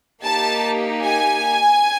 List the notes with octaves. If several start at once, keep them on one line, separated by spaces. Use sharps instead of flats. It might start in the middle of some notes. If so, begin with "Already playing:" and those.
A#3 D#4 G4 A5
G#5